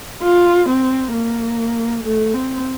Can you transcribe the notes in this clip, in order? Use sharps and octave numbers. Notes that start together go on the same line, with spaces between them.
F4
C4
A#3
A3
C4